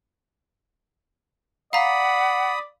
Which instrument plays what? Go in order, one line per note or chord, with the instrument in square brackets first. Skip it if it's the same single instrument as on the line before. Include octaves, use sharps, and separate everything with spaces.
[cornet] D5 [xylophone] F5 A#5 [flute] F#5 [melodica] B5 D#6